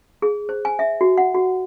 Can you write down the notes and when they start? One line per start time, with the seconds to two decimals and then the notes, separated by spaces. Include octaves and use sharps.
0.22 G#4
0.49 C5
0.65 G#5
0.79 E5
1.01 F#4
1.18 F#5
1.34 F#4